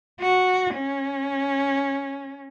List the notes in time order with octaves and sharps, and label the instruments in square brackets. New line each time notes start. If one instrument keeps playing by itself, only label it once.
[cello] F#4
C#4